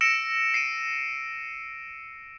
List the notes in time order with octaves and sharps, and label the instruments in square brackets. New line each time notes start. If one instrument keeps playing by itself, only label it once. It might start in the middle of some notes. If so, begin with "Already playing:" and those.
[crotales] E6 A#6 C#7 D7 E7
C7 D7 D#7